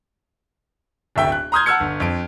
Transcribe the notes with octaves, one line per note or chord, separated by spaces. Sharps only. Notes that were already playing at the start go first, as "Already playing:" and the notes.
D1 G1 E5 G5
F#6
A#5 C6 D#6 F6 G6 G#6
F#5 A5 E6 F6 G#6 C#7
G1
F2 D7